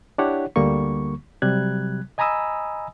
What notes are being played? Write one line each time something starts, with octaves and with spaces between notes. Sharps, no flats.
D4 E4 G4 C#5 F#5
D2 D3 G3 A#3 C#6
C3 F#3 G3 F#6 G#6
D#5 G#5 A#5 B5 D#6 E6